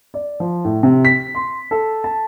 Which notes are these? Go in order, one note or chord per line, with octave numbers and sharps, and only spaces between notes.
D5
F3
A2
C3
B6
C6
A4
A5